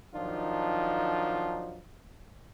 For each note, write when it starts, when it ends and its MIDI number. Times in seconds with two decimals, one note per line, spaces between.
0.14 1.80 51
0.14 1.80 53
0.14 1.80 54
0.14 1.80 62
0.14 1.80 63
0.14 1.80 65